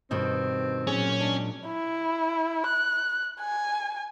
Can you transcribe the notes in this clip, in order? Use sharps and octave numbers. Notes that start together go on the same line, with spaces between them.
G2 B2 D#3 C4
A#2 F#3 C#4 G#4
G#3 D4
E4
F#6
G#5